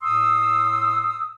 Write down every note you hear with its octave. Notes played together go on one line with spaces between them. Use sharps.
A2 C6 D#6 E6